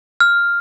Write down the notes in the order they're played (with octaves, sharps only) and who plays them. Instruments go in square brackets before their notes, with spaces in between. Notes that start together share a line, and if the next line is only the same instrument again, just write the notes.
[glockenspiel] F6